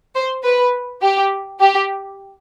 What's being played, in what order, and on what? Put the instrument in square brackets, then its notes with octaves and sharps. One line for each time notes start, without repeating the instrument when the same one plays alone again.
[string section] C5
B4
G4
G4